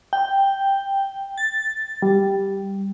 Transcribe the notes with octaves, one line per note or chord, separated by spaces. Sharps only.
G5
A6
G3